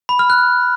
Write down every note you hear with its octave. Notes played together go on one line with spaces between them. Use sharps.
B5
F6
F#6